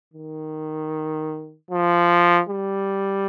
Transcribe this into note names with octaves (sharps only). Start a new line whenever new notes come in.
D#3
F3
G3